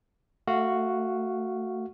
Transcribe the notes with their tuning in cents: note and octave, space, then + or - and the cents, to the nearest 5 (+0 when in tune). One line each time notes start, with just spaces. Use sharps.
A3 +20 F#4 +0 F5 -10